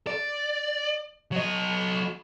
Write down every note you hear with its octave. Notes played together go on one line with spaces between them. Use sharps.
D5
F#3 D#5